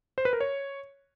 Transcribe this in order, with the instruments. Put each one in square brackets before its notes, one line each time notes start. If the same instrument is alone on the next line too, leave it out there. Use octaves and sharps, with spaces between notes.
[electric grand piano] C5
B4
A#4
C#5